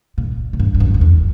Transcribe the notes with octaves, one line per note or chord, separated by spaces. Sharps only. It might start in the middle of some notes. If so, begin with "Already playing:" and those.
A#2
A#2
G2
G2
F#2
F#2
E2